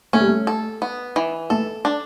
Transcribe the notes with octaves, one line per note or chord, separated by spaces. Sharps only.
A3 C#4
G3
A3
A4
B3
E3
A3 A4
D4